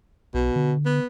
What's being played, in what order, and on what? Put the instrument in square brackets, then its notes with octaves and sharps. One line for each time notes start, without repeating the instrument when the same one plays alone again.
[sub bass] B1 [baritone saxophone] B2
[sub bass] D3
[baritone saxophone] B3